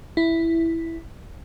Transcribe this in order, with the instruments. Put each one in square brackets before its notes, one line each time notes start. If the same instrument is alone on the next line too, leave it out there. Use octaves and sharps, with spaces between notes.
[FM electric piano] E4